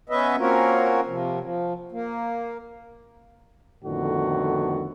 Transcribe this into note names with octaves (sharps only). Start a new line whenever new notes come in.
B3 C#4 B4 D#5 E5
A#3 C4 C#4 F4 F#4 A#4
C3 F3
F3
A#3
F2 A2 D3 D#3 B3 F#4